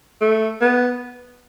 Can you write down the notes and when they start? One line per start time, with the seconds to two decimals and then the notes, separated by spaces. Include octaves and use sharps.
0.21 A3
0.61 B3